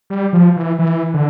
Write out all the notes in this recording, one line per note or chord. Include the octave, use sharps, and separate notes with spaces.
G3
F3
E3
E3
D3